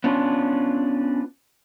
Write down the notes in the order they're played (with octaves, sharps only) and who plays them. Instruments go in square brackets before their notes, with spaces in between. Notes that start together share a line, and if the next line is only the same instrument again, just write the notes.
[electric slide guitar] B3 C#4 D4 F4